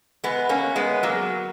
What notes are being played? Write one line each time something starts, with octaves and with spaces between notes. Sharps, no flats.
G#3 B3
A#3 C#4
G#3 B3
F#3 A#3